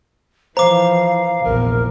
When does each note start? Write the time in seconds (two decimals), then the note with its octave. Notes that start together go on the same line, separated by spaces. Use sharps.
0.57 E3 F3 C5 F5 A#5 D6
1.44 F1 A#1 E2 A#4